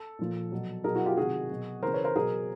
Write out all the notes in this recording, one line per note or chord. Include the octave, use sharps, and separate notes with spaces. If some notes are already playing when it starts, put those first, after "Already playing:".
Already playing: A4
A#2 F3
B2 F#3
B2 F#3 G#4 A#4
E4 F#4
F4 G4
C3 D#3 F#3 F#4 G#4
B2 F#3
C#3 E3 A#4 C5
B4 C#5
A#4 C5
B2 F#3 G#4 A#4